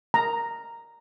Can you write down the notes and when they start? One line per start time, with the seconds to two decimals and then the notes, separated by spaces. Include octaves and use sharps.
0.14 A#5